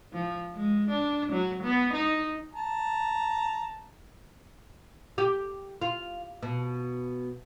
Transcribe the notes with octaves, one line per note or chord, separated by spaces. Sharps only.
F3
G#3
D4
F#3
B3
D#4
A5 A#5
G4
F4
B2